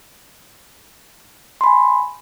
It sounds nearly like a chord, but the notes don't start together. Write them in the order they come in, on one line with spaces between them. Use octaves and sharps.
C6 B5 G#5